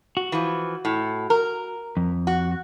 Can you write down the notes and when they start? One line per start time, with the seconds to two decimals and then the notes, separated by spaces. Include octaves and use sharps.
0.17 F#4
0.32 E3 F3
0.85 A2
1.30 A#4
1.97 F2
2.27 F#4